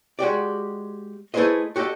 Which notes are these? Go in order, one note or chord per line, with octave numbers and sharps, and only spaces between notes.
G#3 F#4 G4 D5
A3 E4 G#4 B4 C5 D#5
F#4 G4 A4 D#5